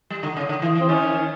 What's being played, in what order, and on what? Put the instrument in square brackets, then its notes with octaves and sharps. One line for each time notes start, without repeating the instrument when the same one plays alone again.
[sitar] G3
D3
C#3
D3
E3
E3
[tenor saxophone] C4
[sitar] D#3 [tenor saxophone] C#4